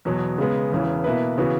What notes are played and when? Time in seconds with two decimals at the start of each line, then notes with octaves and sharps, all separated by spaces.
0.05 E2 B2 F#3
0.38 C#3 G#3 B3
0.72 E1 E2 C#3 E3
1.04 B2 A#3 E4 B4
1.38 C#3 E3 B3 F#4